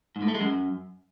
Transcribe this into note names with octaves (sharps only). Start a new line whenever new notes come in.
G#2
A2
A3
G#3
F#2